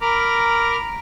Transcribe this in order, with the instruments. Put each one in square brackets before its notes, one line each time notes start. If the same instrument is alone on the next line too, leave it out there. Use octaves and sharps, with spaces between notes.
[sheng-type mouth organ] A#4 A#5 B5 D6 F6